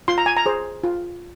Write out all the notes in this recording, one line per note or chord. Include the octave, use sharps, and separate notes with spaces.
F4 C6
A#5
G#5
A#5
G#4 C5
F4